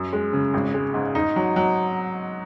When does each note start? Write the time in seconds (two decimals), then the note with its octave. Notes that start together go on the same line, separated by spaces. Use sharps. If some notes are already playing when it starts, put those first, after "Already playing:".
Already playing: F#2
0.13 G#3
0.33 C#3
0.54 G#1
0.74 G#3
0.94 G#2
1.15 D#4
1.36 F#3
1.56 F#3